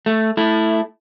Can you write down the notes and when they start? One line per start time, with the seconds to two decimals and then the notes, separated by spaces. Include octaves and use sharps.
0.06 A3
0.37 A3 E4